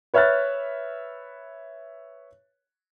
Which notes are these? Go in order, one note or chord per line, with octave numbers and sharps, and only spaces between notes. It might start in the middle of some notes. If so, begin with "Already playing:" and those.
B4 C#5 E5 F6 F#6 A6